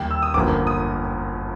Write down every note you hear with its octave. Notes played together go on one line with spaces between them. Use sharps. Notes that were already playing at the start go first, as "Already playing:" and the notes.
Already playing: D#2 D#3 G3
E6
D#6
G1 F#2 D3 F3 A#3 D6
D#6